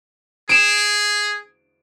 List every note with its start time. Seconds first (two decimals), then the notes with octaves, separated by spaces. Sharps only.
0.49 G#4 D7 E7